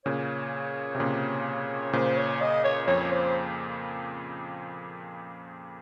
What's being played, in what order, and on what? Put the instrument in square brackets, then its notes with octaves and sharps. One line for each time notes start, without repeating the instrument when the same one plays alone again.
[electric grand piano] A#2 C#3 [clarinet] C#5
[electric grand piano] C3
A#2 C#3
[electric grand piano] A#2 C#3 [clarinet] C5
[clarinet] C#5
D#5
C#5
[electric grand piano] F2 [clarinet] C#5
[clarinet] C5